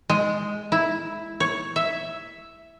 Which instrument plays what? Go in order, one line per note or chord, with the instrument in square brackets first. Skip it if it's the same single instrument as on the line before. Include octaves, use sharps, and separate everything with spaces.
[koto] G#3
E4
C#5
E5